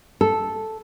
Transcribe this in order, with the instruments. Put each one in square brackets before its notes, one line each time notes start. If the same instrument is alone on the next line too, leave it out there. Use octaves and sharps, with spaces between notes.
[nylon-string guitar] A4